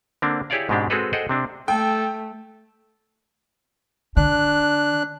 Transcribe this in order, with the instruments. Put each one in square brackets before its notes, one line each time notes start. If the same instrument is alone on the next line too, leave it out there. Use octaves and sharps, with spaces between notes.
[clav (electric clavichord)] D3 A#3 C4 D4
E4 G4 G#4 C#5 D5 F5
G#2 B2 G#3 C4 D4 G4
G#3 C4 F#4 G#4 A4 B4
G#4 A4 C5 D#5 F#5 G5
C3 C4 D4
[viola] A3 [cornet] A4 [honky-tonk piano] G5
[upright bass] D3 [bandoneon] D4 F#6